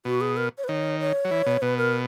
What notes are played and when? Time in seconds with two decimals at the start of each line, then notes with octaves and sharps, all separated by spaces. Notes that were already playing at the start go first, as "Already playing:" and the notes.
0.05 B2 F#4
0.21 G#4
0.37 A#4
0.58 C#5
0.64 B4
0.68 D#3 C#5
1.00 C#5
1.25 F#3
1.31 E3
1.46 B2
1.62 B2 B4
1.77 A#4